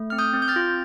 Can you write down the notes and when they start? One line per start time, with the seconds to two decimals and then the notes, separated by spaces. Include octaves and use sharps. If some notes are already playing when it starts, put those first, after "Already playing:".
Already playing: A3
0.10 C4 F6
0.18 D#6 G6
0.33 C4
0.42 G6
0.48 F6 A6
0.56 F4